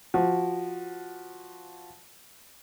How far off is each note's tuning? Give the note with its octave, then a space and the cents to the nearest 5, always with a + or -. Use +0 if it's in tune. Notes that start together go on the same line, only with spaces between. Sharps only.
F3 +0 F#4 +0